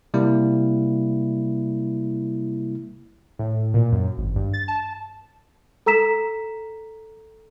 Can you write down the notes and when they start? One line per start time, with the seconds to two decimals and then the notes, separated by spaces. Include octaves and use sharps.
0.14 C3 G3 A#3 E4
3.39 A2
3.74 A#2
3.92 F#2
4.17 G#1
4.36 G2
4.53 A6
4.68 A5
5.86 A4 A#5 E6 B6 E7